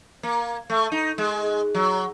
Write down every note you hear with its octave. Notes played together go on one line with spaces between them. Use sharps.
A#3
A3
D#4
G#3
F#3